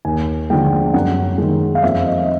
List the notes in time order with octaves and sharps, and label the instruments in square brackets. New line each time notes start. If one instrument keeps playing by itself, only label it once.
[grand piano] D#2 G#5
D3 F3 G#3 G5
F#2 F#5
D#3 G#3
F5
F2 E5
D#5
D#5